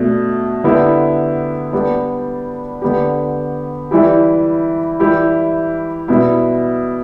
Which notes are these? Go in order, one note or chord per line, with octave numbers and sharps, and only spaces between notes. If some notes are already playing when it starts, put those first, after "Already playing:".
Already playing: B2 A3 D4
D3 B3 E4 G4
G3 B3 D4 G4
D3 B3 G4
E3 G3 E4 G4
E3 G3 E4 G4
B2 G3 B3 E4